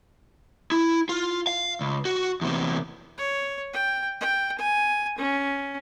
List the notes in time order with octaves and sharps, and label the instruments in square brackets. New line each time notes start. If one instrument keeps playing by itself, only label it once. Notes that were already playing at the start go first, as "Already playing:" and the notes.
[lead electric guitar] E4
F4
F5
C#2
F#4
E2 C3
[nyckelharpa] C#5
G5
G5
G#5
C#4